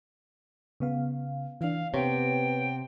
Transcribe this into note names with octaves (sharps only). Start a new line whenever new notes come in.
C#3 B3 F5
E3 D4 F5
C3 B3 C#5 G5